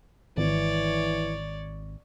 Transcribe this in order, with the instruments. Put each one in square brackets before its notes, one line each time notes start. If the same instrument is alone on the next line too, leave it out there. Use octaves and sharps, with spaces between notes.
[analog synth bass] G#1 [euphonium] E3 [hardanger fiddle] C#5 D5